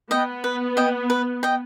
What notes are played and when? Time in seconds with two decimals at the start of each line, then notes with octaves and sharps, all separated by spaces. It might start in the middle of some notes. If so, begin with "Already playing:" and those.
0.11 B3 D#5 G5
0.44 B4
0.77 D#5 G5
1.10 B4
1.43 D#5 G5